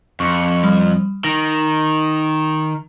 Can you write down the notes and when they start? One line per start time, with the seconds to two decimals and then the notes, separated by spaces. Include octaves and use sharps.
0.20 F2 C#6 D6 C#7
0.64 G3
1.24 D#3 A#6